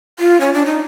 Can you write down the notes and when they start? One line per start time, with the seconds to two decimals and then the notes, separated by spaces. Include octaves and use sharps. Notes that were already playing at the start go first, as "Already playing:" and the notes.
0.19 F4
0.41 C#4
0.54 D4
0.66 D#4